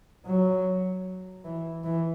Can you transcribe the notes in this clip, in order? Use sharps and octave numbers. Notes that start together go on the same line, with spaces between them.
F#3
E3
E3